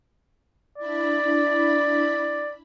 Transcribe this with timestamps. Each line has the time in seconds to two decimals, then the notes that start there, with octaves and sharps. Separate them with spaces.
0.78 D4 E4 D5 B5